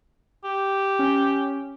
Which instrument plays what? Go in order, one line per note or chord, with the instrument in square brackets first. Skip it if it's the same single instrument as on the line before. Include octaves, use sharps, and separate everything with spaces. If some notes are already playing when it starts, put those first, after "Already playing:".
[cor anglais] G4
[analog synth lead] C#4